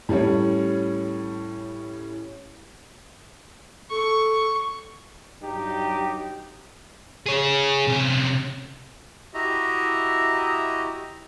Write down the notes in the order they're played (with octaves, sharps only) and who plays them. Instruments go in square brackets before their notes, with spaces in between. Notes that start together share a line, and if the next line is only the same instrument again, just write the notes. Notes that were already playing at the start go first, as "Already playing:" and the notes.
[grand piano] A2 G3 C#4 C#5
[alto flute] A4 [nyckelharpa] C#6
[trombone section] G2 F#3 D#4 G4
[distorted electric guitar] G#4 C#5
C3 C#4
[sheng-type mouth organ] E4 F#4 G4 D#5 E5 A#5